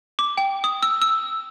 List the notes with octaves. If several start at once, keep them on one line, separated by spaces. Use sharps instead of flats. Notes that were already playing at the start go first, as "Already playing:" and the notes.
D6
G5
D#6
E6
E6